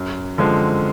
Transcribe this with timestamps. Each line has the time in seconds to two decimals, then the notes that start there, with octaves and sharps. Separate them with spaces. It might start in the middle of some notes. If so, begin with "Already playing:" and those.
Already playing: F#2
0.38 D3 F3 G#3 C4